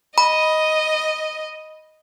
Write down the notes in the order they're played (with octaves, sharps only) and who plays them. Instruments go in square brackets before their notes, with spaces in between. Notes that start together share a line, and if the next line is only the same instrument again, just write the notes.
[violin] D#5 [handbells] B5